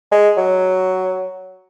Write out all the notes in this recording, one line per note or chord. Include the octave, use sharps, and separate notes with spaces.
G#3
F#3